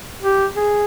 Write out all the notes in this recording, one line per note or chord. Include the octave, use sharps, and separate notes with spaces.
G4
G#4